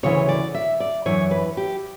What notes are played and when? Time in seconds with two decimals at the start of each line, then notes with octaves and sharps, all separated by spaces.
0.03 D2 C#3 E3 C#5
0.29 D5
0.54 E5
0.80 D5
1.06 F#2 E3 C#5
1.31 B4
1.57 G4